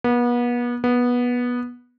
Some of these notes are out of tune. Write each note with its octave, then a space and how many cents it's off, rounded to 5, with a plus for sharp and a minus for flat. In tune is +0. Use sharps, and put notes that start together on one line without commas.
B3 -35
B3 -15